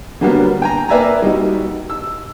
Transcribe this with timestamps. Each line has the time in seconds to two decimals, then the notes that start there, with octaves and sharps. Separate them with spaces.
0.21 D3 F#3 G3 A#3 B3
0.62 G5 G#5 A#5
0.89 A#3 B4 D5 E5 G#5 A#5
1.22 G3 D#4 F#4
1.90 E6